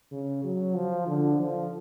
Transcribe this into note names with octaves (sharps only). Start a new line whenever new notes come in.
C#3
F#3
F3
D3
F3